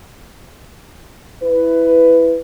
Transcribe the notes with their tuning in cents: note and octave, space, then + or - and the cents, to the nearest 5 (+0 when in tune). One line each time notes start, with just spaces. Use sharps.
E4 +0 B4 +10